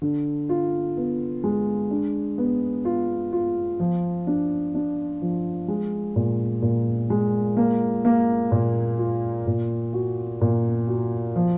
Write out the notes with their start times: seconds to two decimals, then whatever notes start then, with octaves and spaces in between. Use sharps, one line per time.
0.02 D3
0.49 F4
0.97 B3
1.44 G#3
1.91 D4
2.38 B3
2.85 F4
3.32 F4
3.80 F3
4.27 D4
4.75 D4
5.22 F3
5.68 G#3
6.16 A#2
6.62 A#2
7.10 G#3
7.57 A#3
8.05 A#3
8.52 A#2
8.99 F4
9.47 A#2
9.93 F#4
10.41 A#2
10.87 F#4
11.36 F3